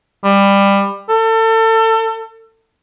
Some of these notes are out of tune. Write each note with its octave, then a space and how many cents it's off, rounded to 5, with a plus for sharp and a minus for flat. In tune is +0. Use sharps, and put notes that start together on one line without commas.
G3 +20
A4 +30